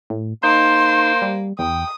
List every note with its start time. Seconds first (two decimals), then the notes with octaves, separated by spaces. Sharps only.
0.10 A2
0.44 A#3 D#4 C5 C6
1.22 G3
1.59 E2 G5 D#6